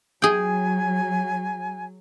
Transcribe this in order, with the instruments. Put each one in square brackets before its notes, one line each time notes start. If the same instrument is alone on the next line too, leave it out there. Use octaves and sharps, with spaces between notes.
[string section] F#3 [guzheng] G#4 G5 [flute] G#5